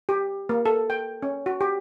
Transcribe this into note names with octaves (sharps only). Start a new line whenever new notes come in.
G4
A#3
A4
G5
C#4
F#4
G4